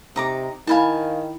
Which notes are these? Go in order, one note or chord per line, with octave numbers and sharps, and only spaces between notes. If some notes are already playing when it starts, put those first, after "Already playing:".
C3 D#4 A#5 D6
D#3 E4 F5 G#5 A5 B5